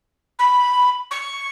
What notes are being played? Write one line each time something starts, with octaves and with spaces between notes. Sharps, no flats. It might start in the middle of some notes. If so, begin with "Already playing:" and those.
B5
C#6